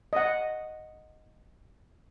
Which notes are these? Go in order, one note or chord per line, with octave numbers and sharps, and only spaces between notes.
D#5 F#5